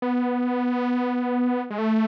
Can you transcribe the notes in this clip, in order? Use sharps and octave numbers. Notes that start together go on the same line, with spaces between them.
B3
G#3
A3